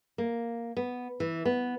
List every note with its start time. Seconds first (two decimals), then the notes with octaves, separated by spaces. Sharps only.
0.18 A#3
0.77 B3
1.20 E3
1.45 B3